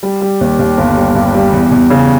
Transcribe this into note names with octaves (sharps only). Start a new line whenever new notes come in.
G3
G3
D#2
D#2
G1
G3
G2
G3
E2
E2
C#3